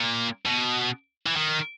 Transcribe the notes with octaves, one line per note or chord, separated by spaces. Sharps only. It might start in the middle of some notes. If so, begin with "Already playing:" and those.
Already playing: A#2
B2
E3
D#3